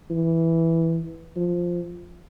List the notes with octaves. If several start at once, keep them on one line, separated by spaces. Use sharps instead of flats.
E3
F3